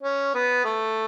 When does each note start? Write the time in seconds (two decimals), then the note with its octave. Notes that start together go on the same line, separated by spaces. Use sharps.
0.03 C#4
0.34 B3
0.64 A3